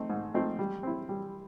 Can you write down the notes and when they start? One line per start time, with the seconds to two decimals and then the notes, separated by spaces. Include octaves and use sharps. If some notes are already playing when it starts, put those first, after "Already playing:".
Already playing: A3 C4 D#4
0.10 G#2
0.34 F3 A3 C4 D#4
0.59 G3
0.83 C4 E4
1.09 G3